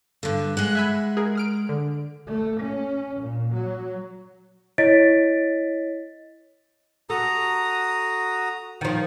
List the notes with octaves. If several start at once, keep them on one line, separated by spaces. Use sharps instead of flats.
G2 D3
G#3 F#5
E5 G#5 B5
G#4 A#4
D#6 F6 D7
D3
A3
C#4
A#2
F#3
E4 C#5 D#5 A6 B6 D7
F#4 A4 A#5 D#6
D#3 F3